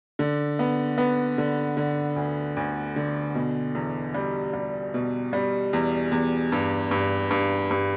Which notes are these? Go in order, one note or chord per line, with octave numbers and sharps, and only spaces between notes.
D3
B3
B3
D3
D3
D2
D2
D3
B2
E2
G3
G3
B2
G3
E2
E2
G2
G2
G2
G2